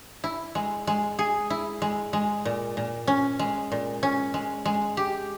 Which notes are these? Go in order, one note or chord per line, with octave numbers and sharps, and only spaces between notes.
E4
G#3
G#3
G#4
E4
G#3
G#3
A#2
A#2
C#4
G#3
A#2
C#4
G#3
G#3
G4